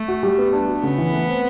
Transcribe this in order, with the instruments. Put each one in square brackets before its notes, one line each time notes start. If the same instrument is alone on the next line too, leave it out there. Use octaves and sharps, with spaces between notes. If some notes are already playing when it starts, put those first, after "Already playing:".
Already playing: [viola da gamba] A3
[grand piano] F#4
G3
B3
D4
F#4
[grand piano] C#3 [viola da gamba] B3
[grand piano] E3
A3
C4